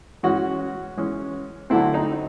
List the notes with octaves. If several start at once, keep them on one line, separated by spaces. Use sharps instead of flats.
E3 G#3 C#4 F#4
E3 G#3 C#4
D3 F#3 A3 C4 E4
D#4